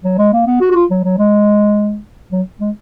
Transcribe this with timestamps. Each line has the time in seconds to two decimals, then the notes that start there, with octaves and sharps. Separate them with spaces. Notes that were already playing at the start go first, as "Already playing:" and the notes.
0.04 F#3
0.18 G#3
0.33 A#3
0.47 B3
0.61 F#4
0.72 F#4
0.75 F4
0.90 F#3
1.04 F#3
1.18 G#3
2.32 F#3
2.61 G#3